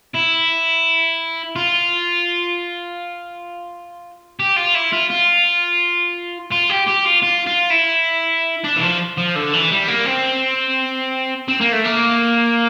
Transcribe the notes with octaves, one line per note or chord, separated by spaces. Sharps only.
E4
F4
G4
F4
E4
F4
F4
F4
G4
G4
F4
F4
F4
E4
D4
E3
F3
F3
D3
E3
G3
A#3
C4
C4
A#3
A3
A#3